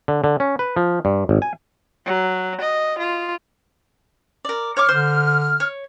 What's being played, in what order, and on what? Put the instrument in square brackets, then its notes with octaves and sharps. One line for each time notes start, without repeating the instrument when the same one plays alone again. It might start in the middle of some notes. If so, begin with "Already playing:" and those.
[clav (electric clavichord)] D3
D3
C#4
B4
F3
G2
G#1
G#5
[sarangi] F#3
D#5
F4
[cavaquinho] A#4 D5
[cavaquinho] C#5 C#6 D6 [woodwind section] F6
[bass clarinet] D3 [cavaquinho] C5
[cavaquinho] C#5